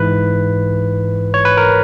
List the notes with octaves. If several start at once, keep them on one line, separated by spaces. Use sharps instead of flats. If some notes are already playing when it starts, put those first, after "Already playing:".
Already playing: G#2 E3 B4
C#5
B4
A#4